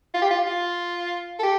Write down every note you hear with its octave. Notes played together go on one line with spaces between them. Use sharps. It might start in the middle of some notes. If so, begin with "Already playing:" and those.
F4
G4
F4
F4
A4
G4